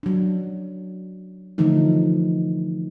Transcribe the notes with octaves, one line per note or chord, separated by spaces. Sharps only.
F#3 D4
D3 E3 F3 A3 D#4